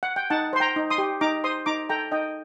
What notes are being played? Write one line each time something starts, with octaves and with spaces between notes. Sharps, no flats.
F#5
G5
D#4 F#5 A5
C5 C6
G5 A#5
D#4
C6 D#6
G4
D#4 A#5 D6
C5 C6 D#6
D#4 A#5 D6
A4 G5 A#5
D#4 D#5 G5